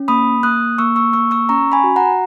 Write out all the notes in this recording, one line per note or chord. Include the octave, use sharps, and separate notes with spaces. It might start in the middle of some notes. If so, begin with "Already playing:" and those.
Already playing: C#4
A#3 B5 D#6
A#3 D#6 F#6
A#3 C#6 E6
C#6 E6
A#3 C#6 E6
C#6 E6
C#4 A#5 C#6
G#5 B5
F#4
F#5 A#5